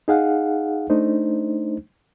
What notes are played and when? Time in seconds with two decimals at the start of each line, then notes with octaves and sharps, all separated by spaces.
0.08 D#4 G#4 F5 F#5
0.90 A3 D4 D#4 C5